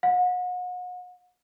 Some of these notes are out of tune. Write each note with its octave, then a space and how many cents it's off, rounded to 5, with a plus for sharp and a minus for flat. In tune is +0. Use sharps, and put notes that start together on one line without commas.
F#5 -35